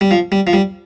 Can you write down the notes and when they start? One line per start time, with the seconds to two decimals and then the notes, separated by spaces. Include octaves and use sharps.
0.01 G3
0.11 F3
0.32 G3
0.47 F3
0.53 G3